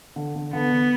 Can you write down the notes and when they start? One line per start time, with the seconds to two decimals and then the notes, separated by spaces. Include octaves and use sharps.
0.16 D3
0.36 D3
0.53 D3 B3
0.71 D3